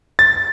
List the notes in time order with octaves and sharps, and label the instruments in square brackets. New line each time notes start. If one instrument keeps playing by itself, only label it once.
[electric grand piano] A6